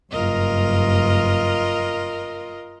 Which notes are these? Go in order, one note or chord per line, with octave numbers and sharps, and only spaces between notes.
F#1 G2 F4 A#4 D#5